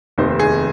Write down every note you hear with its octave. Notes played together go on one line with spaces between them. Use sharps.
F1 D#2 D#3 C5
G#4